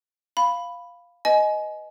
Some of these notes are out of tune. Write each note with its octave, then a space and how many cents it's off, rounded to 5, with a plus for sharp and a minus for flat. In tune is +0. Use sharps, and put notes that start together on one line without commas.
F5 +0 B5 +0
B4 +0 D#5 +0 G#5 +25